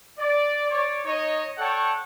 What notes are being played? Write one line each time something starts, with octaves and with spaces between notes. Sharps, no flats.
D5
C#5 D5
D#4 C#5 D#5
A4 C#5 D5 F#5 G5 A5